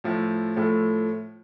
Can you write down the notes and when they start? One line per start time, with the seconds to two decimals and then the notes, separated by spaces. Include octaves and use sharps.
0.04 A2 F3 A3
0.57 A2 F3 A3